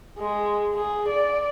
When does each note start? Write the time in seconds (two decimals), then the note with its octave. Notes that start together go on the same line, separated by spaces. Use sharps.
0.18 G#3
0.75 G#4
1.09 D5